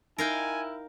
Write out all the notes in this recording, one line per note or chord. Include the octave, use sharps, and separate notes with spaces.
D#4 E4 A#4 F5 G5 G#5